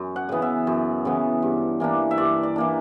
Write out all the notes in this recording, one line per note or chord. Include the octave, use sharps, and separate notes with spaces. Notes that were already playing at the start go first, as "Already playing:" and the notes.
Already playing: F#2
F#5
C#3 E3 B3
E5
F#2
C#3 E3 B3
G2
E3 A#3 D4
E5
G2 D5
D5
E3 A#3 D4